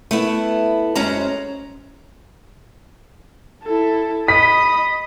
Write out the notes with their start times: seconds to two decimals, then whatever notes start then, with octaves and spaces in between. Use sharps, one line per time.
0.11 A3 B3 E4
0.95 F#2 F#3 G#3 C#4 C5 A#5
3.64 E4 A4
4.28 D#5 B5 D#6 B6